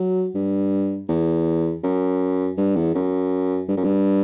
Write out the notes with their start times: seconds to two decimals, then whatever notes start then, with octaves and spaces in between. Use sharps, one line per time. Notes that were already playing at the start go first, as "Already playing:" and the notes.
Already playing: F#3
0.35 G2
1.09 E2
1.84 F#2
2.57 G2
2.76 E2
2.95 F#2
3.69 G2
3.77 F#2
3.84 G2